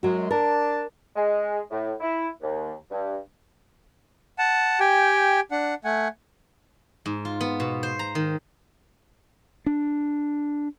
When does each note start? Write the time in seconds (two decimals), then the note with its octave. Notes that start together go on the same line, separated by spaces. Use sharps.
0.03 F#2 F#3 G#3 F#4
0.31 D4 A#4 A5
1.16 G#3
1.70 A2
2.00 E4
2.41 D#2
2.91 G2
4.38 F#5 A5
4.80 G4 G5 G#5
5.51 D4 F#5
5.85 A3 F#5 G#5
7.06 G#2
7.25 F4
7.41 B3
7.60 B2
7.83 C5
7.99 A#5
8.15 D#3
9.66 D4